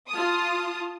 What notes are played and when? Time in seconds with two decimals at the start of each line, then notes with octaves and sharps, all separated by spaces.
0.11 F4 A5 D#6